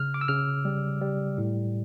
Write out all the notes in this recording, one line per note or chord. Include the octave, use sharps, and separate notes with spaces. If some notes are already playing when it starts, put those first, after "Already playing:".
Already playing: C#3 F6
D6
E6
C#3 F6
G3
G3
A2